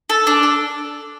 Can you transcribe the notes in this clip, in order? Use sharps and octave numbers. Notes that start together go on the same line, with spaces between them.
A4
D4
A4